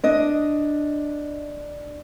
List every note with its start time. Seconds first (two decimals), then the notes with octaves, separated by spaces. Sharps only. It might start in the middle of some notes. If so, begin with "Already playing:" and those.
0.04 D4 D#5